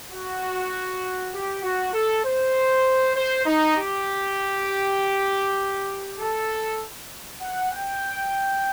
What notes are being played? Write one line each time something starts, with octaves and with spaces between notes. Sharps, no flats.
F#4
G4
F#4
A4
C5
C5
D#4
G4
A4
F#5
G5